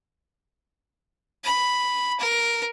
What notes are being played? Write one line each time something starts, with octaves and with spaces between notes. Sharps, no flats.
B5
A#4